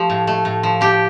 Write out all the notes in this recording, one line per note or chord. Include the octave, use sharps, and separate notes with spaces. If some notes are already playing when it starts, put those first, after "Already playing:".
Already playing: F3 A3 G4 A4
A2
A3
A2
F3
A2 G4